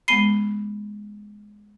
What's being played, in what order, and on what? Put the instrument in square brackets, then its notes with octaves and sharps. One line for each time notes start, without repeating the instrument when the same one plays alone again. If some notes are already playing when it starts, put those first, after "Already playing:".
[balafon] G#3 B3 B5 [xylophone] C7 D#7 G7